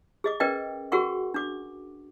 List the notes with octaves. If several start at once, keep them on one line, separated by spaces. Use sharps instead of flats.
G#4 D#5 D6
C#4 A#4 B4 D5 D#5 G5
F#4 G#4 A#4 F#5 C#6
D4 D6